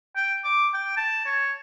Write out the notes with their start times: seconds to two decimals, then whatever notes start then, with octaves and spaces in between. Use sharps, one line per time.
0.16 G5
0.44 D6
0.74 G5
0.97 A5
1.26 C#5